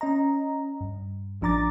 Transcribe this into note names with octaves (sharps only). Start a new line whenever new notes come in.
C#4 D#5 A#5
G2
A1 F3 D4 A#5 D6 A6